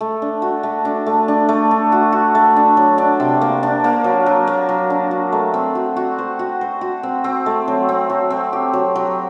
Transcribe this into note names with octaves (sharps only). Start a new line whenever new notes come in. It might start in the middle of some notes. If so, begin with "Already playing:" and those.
A3
D4
F#4
A3
D4
A3
D4
A3
D4
F#4
F#4
A3
D4
F#3
D4
C3
A#3
D4
A#3
F#3
F#3
A#3
F#3
D4
F#4
A3
C4
F#4
F#4
C5
F#4
C5
F#4
C4
C4
A3
F#3
C4
F#3
C4
G4
F#3
F#3